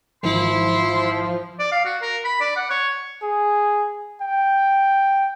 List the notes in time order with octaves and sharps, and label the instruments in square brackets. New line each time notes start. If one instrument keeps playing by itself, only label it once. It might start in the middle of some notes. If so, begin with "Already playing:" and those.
[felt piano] G#1 E3 [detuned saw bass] F3 [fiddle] E4 [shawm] C6
[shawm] D5
F5
F#4
A#4
B5
D5
F#5
C#5
[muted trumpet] G#4
G5